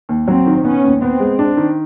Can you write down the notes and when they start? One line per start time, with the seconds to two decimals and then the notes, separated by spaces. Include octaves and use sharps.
0.09 D#2
0.27 F#3 C4
0.46 D#3
0.64 B3 C#4
0.84 D#2
1.02 B3 C4
1.20 G#3
1.39 D4
1.57 D#3